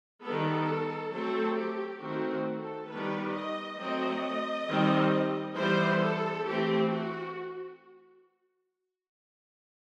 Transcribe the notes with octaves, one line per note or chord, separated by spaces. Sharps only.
D#3 G3 B3 A4
F#3 A3 C4 A4
G4
D#3 A3 C4 F#4
A4
D#3 G3 B3 B4
D#5
F#3 A3 C4 D#5
D#3 G3 C4
E3 G3 B3 C5
A4
E3 A3 C4 G4
F#4